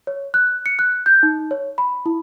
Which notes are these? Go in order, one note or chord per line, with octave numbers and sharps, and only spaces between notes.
C#5
F#6
C#7
F#6
G6
D#4
C#5
B5
E4